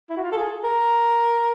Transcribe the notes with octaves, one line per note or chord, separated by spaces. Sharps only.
E4
F#4
F4
A4
G#4
A#4